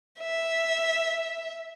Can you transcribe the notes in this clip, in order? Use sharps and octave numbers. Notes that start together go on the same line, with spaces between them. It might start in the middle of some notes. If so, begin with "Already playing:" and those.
E5